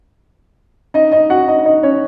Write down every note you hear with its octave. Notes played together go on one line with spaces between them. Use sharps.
D#4 D#5
D#4 D#5
F#4 F#5
D#4 D#5
D#4 D#5
C#4 C#5